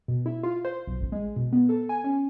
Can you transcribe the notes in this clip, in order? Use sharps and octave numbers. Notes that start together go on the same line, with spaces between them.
B2
E4
F4
C5
B1
A1
G#3
B2
B3
A4
G#5
C#4